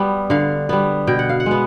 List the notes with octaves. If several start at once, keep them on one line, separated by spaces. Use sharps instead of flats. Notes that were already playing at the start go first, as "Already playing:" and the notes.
Already playing: G3 B3
D3 F5
G3 B3
B2 G5
F#5
F5
F#5
G#3
B3